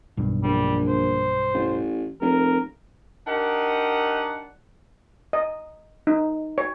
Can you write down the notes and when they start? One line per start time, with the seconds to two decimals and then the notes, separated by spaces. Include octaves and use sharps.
0.17 B1 G2
0.43 A#1 G3
0.88 C5
1.54 A1
2.21 F1 A#4
3.27 D4 D#4 G4 A#4 F#5
5.33 D#5
6.07 D#4
6.58 C#5